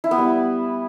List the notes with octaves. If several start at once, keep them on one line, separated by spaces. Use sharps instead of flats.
E4
B3
G3